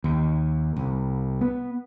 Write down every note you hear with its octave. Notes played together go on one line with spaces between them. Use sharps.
D#2
C2
B3